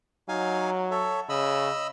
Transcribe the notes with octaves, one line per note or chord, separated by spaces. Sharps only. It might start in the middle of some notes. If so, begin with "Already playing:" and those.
F#3 D#4 F5 G#5
A4 C#5 E5
C#3 D#5 B5 E6